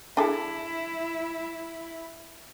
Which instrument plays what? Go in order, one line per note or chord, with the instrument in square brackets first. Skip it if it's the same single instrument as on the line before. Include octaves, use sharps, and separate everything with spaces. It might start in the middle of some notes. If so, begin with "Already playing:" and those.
[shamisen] D4 G#4 A4 [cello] E4